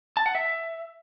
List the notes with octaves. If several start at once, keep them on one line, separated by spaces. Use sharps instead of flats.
A5
F#5
E5